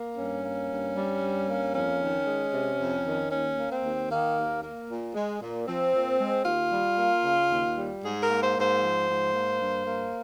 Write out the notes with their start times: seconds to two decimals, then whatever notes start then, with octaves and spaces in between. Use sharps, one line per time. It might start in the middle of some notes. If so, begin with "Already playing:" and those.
Already playing: A#3
0.17 G2 C#4
0.44 A#3
0.70 G2
0.96 G3
1.21 G2
1.49 A#3
1.74 F2 C#4
2.01 D#3
2.27 G#3
2.52 C3
2.78 F2
3.06 D#3
3.31 D#2 C#4
3.58 A#3
3.70 C4
3.83 D#2
4.10 D#3 A#3
4.37 D#2
4.63 A#3
4.88 A#2
5.14 G#3
5.41 A#2
5.67 F3 C4
5.93 A#2
6.19 G#3
6.45 D#2 F4
6.72 G3
6.98 A#3
7.23 C#3
7.50 D#2
7.77 G3
8.03 G#2 G#4
8.23 A#4
8.28 A#3
8.42 C5
8.55 G#2
8.61 C5
8.81 F3
9.07 G#2
9.33 A#3
9.59 G2
9.86 A#3